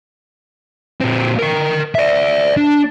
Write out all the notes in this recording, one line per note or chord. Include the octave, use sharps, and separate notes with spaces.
A#2 C4
A#4 G5
D5 E5
D4